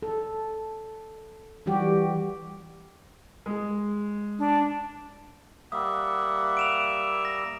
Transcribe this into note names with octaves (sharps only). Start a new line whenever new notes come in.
A4
E3 G3 F#4 G4
G#3
D4
G3 A#3 E5 F#5 D#6
D7 E7 F7
A#6